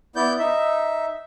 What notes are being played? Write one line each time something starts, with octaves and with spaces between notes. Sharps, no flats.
B3 E4 D5 G6
D#4 E5